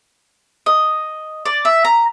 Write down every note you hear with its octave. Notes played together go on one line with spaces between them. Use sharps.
D#5
D5
E5
A#5